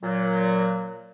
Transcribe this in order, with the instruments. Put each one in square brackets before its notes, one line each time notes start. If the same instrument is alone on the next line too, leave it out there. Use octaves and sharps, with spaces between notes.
[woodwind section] A#2 F#3